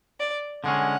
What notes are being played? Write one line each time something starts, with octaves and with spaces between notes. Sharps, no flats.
D5
D3 G#3 C#4 F#5